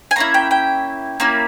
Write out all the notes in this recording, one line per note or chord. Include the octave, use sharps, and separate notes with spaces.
G#5
A#3 C#4 E4 A#5
G5
G5
A#3 C#4 E4